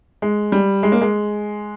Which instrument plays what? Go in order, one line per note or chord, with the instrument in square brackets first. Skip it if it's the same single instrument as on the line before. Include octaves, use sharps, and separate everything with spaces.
[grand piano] G#3
G3
G#3
A#3
G#3